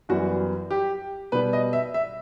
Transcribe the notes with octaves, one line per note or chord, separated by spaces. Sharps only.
F#2 E3 G3 B3 F#4
G4
B2 G3 B3 B4
D#5
E5
E5